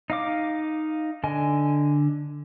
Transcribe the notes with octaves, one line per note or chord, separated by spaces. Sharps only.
D#4 F5 D6
D3 D#5 G#5